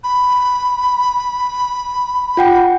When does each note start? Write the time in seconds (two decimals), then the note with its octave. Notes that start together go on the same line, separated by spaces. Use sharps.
0.04 B5
2.37 F4 F#5 G5